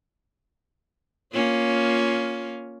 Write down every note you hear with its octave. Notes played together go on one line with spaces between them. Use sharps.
A#3 C#4 F4